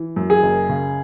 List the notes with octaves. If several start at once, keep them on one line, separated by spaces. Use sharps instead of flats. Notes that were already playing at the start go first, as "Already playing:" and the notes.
Already playing: E3
F#2
G#4
F#1
C#3